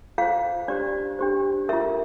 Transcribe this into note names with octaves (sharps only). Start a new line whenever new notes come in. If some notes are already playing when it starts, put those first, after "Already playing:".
F4 C5 F5
D4 G4 C5 D5
D4 G4 C5
F4 A#4 E5